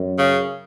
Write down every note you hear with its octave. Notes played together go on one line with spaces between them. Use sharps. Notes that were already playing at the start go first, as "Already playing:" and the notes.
Already playing: F#2
C#3